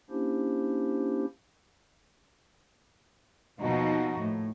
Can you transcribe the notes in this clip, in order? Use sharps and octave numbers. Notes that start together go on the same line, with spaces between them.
A#3 C#4 D4 E4 G4 C5
D#2 B2 F3 D#4 F#4
A2